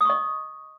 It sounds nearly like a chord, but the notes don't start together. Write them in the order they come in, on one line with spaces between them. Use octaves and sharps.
D#6 C#6 D#5